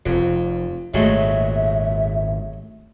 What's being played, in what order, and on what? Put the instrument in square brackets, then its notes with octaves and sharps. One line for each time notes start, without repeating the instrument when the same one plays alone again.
[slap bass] F1 [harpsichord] F2
[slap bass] G#1 A#2 [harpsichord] F#3 G#3 A3 [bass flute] E5